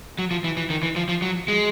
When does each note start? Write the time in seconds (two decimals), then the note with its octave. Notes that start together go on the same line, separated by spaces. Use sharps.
0.19 F#3
0.31 F3
0.44 E3
0.57 E3
0.70 D#3
0.83 E3
0.96 F3
1.09 F3
1.22 F#3
1.48 G#3